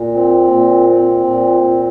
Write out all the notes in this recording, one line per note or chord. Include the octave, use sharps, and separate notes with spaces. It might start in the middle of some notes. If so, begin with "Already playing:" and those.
Already playing: A#2
C4
A#2
C4
A#2
A#2